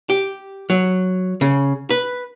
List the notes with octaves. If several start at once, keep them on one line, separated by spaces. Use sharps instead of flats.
G4
F#3
C#3
B4